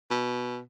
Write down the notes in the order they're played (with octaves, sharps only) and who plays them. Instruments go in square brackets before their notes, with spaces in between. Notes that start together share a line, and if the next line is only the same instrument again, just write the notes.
[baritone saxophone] B2